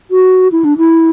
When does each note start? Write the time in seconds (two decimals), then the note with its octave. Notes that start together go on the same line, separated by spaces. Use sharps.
0.11 F#4
0.52 E4
0.64 D4
0.78 E4